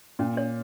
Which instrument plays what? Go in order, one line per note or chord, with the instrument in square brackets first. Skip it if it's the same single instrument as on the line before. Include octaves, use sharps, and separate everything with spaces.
[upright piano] A#2 [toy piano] C#4
[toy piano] C#5